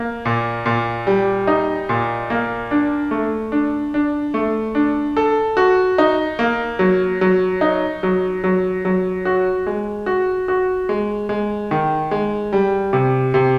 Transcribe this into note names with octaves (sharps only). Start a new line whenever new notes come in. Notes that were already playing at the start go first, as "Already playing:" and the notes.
Already playing: A#3
A#2
A#2
G3
D#4
A#2
A#3
D4
A3
D4
D4
A3
D4
A4
F#4
D#4
A#3
F#3
F#3
D#4
F#3
F#3
F#3
F#4
G#3
F#4
F#4
G#3
G#3
D#3
G#3
G3
C3
C3